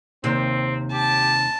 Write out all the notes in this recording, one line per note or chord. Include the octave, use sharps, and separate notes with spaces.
D#2 C3 C4
G4 A5